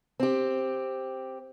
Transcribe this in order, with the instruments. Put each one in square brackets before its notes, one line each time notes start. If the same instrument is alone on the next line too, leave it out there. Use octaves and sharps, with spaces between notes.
[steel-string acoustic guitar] C4 G4